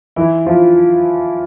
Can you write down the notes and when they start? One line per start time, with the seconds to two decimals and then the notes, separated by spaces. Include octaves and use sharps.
0.16 E3 E4
0.46 F3 F4